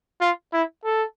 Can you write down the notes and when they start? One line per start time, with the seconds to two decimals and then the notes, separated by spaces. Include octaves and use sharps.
0.21 F4
0.53 E4
0.84 A4